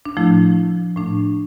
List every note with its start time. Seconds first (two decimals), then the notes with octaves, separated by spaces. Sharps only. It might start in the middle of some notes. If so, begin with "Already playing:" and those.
0.05 D4
0.17 A2 F3 A3 E4
0.96 A2 F3 A3 D4